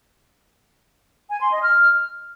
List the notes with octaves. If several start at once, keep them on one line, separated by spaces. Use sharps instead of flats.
G#5
C6
D#5
F6